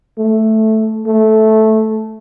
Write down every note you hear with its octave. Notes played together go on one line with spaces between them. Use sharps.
A3
A3